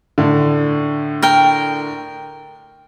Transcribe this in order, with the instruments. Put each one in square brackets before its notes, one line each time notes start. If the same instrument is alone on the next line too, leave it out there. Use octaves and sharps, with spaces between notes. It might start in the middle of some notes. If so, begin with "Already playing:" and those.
[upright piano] A2 D3
[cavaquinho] A#4 G5